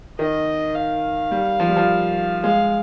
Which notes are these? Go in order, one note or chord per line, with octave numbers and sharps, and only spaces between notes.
D#3 D#5
F5
G3
F3
G3
F3
G#3 F5